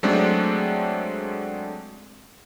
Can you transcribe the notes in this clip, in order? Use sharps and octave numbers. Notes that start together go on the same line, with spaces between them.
F#3 G#3 A3 C4 D4